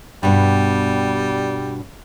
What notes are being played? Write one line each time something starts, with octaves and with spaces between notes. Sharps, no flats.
G2 B2 G3